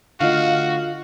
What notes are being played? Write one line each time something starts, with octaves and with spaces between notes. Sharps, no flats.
D3 A3 F4 F#4 D#5 F5